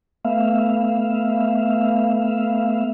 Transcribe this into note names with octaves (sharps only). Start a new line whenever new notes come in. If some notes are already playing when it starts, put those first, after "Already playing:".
A3 B3 E5 F5